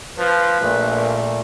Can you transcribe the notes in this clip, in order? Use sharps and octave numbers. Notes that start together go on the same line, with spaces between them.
F3 B4
A#1 A#2 A3